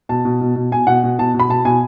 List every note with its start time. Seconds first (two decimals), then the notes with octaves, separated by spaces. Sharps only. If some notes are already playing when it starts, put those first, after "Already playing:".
0.09 B2 A5
0.25 B2
0.41 B2
0.56 B2
0.71 B2 G#5
0.87 B2 F#5
1.03 B2
1.18 B2 A5
1.34 B2
1.40 B5
1.49 B2 A5
1.65 B2 G#5